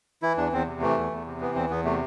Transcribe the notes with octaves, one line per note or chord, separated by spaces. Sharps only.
E3 E4
E2 D4
E2 C4
C3
E3 A3
E2
E2
C3
E3 B3
E2 C4
E2 B3
C3 A3